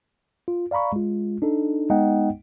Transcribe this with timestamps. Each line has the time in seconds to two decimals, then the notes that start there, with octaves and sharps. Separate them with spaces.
0.48 F4
0.71 D5 F5 A#5 B5 C#6
0.93 G#3 F4
1.42 D4 D#4 A4
1.90 G#3 B3 D#4 D#5 F#5 G5